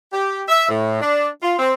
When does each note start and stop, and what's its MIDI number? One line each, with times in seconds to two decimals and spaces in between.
0.13 0.41 67
0.49 0.68 76
0.68 0.99 45
1.01 1.27 62
1.42 1.54 65
1.59 1.73 60